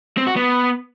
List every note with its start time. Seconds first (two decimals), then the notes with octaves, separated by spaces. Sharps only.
0.17 C4
0.27 F#4
0.36 B3